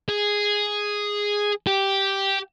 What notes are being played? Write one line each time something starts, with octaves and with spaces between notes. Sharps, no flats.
G#4
G4